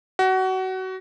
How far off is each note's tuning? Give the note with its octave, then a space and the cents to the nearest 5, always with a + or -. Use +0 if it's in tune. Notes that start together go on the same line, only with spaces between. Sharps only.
F#4 +25